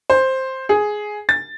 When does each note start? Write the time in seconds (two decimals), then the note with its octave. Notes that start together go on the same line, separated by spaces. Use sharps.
0.10 C5
0.69 G#4
1.29 A6